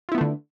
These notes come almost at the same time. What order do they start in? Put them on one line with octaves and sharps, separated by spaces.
F4 E4 B3 A3 D3